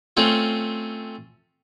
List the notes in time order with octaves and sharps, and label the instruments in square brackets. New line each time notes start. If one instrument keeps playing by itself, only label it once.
[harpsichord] A3 C4 C#4 F4